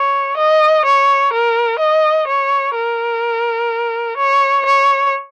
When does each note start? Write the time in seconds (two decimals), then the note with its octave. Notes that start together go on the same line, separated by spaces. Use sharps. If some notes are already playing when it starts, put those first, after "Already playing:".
Already playing: C#5
0.37 D#5
0.86 C#5
1.33 A#4
1.79 D#5
2.28 C#5
2.75 A#4
4.18 C#5
4.66 C#5